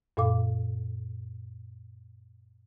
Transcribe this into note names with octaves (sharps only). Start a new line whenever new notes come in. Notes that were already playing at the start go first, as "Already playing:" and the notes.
F#2 A#2 A4 F5 D6